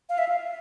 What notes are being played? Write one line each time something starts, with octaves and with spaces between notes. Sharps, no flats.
F5
E5
F5